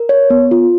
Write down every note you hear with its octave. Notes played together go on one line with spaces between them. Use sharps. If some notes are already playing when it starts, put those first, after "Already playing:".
Already playing: A#4
C#5
B3
F4